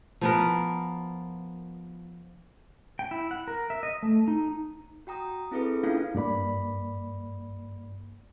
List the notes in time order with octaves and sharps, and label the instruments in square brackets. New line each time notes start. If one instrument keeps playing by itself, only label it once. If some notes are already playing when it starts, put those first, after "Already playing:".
[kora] F3 B3 A#4
[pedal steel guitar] G5
E4
F#5
A#4
E5
D#5
A3
D#4
[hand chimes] F#4 G5 A#5 D#6
C4 E4 G#4 A4 B4
A#3 C#4 D4 E4 F4 F5
[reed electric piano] G2 A#3 D5 B5